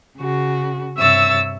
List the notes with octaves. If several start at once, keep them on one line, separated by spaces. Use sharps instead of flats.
C#3 F#4
G2 C3 C#5 E5 E6 A6